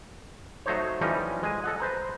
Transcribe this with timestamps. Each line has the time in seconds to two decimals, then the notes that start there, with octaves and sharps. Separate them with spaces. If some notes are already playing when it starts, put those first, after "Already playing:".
0.66 F#3 A3 D#4 C5 C#5
1.01 E3 F3 G3 A3 C#4 D#4
1.43 G#3 G#5
1.64 A4 D#5 F#5
1.80 B4 C5 A#5